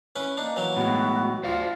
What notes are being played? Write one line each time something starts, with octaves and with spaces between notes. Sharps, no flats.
C#4 E4 B4
A#3 D4 D#4
E3 F#3 E4
A2 G#3 B3 F#4
D2 F4 C5 D5 F5